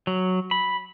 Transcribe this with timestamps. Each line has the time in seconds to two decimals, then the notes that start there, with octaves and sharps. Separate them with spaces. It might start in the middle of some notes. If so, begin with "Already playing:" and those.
0.07 F#3
0.51 B5